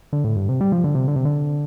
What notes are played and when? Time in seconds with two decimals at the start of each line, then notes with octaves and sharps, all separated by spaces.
0.13 D3
0.24 A2
0.36 G2
0.49 C3
0.61 G3
0.72 F3
0.84 D3
0.95 C3
1.08 D3
1.16 C3
1.25 D3